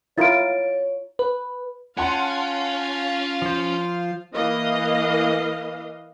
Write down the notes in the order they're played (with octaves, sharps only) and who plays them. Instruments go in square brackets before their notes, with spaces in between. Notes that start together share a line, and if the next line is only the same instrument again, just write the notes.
[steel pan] E4 F4 A#4 [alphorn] C#5 [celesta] A6 D7
[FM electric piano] B4
[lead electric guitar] C#4 [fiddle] F4 F5 [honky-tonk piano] F#5 A5 C6
[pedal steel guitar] F3 C5
[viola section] E3 A#3 D#5 F5